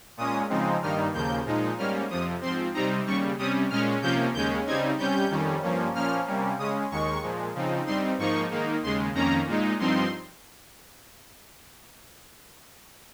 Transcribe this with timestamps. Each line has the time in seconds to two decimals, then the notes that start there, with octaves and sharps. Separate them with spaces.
0.17 A#2 G#3 C#4 D#6
0.50 C#3 F3 G#3 C4 D#4
0.82 G2 D#3 G3 A#3 D#4 F6
1.13 D#2 C#3 F3 A#3 G6
1.46 A#2 F3 G#3 D#4
1.78 G#2 G3 A#3 C#4 F6
2.10 F2 C3 F3 D#6
2.41 G#2 F3 C4 C6
2.74 C3 G3 C4 D#4 A#5
3.07 D#2 C#3 G3 C#6
3.39 C3 G3 C#4 D#6
3.70 A#2 G#3 C#4 F6
4.02 C3 F3 A#3 C#4 G6
4.34 D#2 C#3 G#3 C#4 G6
4.66 C#3 G3 C4 D#4 G#6
4.99 C3 G3 C#4 G6
5.30 F2 D#3 G3 C#4
5.63 G2 F3 A#3 C#4
5.95 A#2 F3 A#3 C#4 F6
6.26 C3 G3 A#3 C#4
6.58 C#3 G#3 C#4 D#6
6.91 D#2 D#3 G#3 C#6
7.23 A#2 F3 G#3
7.54 C#3 F3 C4 D#4
7.86 G2 G3 C4 D#4 C6
8.18 G#2 F3 A#3 D#4 C#6
8.50 G#2 D#3 A#3 D#4
8.83 D#2 C#3 G#3 C6
9.14 F2 D#3 A#3 C#4 A#5
9.47 A#2 G#3 D#4
9.79 G2 F3 C4 D#4 C6